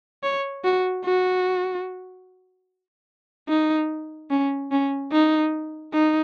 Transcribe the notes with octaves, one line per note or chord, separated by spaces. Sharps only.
C#5
F#4
F#4
D#4
C#4
C#4
D#4
D#4